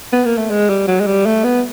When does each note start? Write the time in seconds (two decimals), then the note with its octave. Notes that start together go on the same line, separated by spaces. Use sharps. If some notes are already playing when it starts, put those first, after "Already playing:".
0.13 B3
0.25 A#3
0.37 A3
0.50 G#3
0.69 G3
0.88 F#3
1.01 G#3
1.07 G3
1.26 A3
1.44 B3